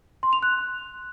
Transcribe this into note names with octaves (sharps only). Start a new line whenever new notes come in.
C6
F7
F#6